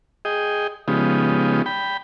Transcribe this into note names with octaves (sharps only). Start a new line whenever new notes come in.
G#4 D#5 G5
C#3 F3 G#3 B3 D#4 G4
G5 B5